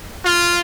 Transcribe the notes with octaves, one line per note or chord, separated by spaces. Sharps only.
F4